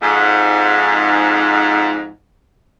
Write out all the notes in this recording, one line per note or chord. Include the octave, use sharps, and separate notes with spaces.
F2 G#2